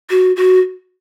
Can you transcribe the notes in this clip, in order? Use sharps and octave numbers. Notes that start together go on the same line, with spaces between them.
F#4
F#4